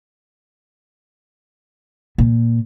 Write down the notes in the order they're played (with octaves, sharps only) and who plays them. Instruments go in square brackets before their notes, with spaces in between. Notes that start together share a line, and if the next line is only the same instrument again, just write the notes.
[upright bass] A#2